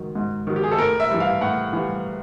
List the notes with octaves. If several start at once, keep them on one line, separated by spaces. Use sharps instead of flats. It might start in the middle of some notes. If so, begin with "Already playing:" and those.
Already playing: G#2 D#3 F#3
G#2
D#3 F#3
G4
G#4
A4
A2 A#4
E5
E3 G3
F5
A2 F#5
E3 G3